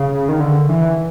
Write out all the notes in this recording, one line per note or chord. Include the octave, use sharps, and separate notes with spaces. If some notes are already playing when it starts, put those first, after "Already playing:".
Already playing: C#3
D#3
D3
E3